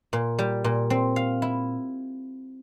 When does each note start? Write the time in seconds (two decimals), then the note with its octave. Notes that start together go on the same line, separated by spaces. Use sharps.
0.13 A#2
0.39 G3
0.64 A#2
0.90 C4
1.16 F5
1.42 E4